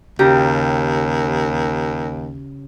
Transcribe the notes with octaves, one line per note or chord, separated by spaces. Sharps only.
D#2 C#3 G4 A#5